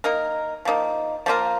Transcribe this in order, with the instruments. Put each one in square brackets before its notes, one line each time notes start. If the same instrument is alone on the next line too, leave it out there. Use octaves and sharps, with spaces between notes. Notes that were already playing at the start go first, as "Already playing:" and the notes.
[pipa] A#3 D#4 A#4
F3 A#3 D#4
F3 A#3 F4 A#4